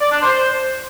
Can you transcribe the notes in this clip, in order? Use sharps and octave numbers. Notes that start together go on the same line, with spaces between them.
D5
D4
C5